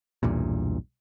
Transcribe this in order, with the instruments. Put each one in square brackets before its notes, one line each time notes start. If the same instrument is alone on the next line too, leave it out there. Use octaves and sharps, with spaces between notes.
[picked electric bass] B1 E2 G2 A#2